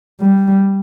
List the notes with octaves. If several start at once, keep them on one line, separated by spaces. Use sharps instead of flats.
G3